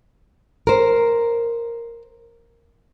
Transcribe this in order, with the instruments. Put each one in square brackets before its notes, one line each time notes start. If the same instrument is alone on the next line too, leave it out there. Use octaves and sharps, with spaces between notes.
[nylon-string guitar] A#4 C5